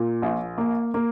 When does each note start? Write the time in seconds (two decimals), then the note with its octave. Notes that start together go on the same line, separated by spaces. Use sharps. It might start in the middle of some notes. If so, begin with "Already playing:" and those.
Already playing: A#2
0.22 A#1
0.58 A#3
0.94 A#3